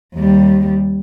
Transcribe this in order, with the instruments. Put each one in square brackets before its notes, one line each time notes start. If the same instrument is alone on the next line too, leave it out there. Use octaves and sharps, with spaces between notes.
[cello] D#2 G3